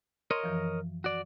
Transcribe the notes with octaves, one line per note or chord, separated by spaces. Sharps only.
A#4 C#5 D#5 C6
F#2 E3 F3
F#4 D5